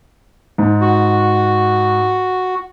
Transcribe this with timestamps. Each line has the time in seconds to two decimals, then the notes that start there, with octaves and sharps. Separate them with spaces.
0.58 G#2
0.81 F#4